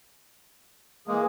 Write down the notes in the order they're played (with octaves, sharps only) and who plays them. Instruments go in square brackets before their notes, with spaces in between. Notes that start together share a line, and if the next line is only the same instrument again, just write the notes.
[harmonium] E3 G#4 [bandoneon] G#3 A#3